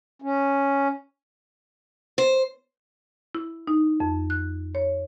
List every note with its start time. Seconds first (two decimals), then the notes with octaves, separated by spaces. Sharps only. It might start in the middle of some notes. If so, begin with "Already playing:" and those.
0.22 C#4
2.18 C5
3.35 E4
3.67 D#4
4.00 F2
4.30 F#6
4.75 C#5